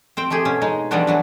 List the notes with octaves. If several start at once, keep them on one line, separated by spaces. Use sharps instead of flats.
C4 C5 G5
A3 C4 G4 G#4
B2 C#4
G#3 D#4
E3 F3 G3 B3 D4 F#4
E3 F#3 D4